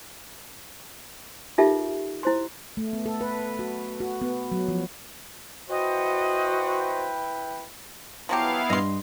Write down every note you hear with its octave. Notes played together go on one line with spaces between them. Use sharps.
D#4 F4 G4 A4 A#4 E5
E4 C5 C6
A3
B3
A4
B4
F#4
F#4
B3
F#3
F3
E4 F#4 B4 C5 D#5 G5
F3 F#3 B3 E4 G4 F5
G2 D#5 C6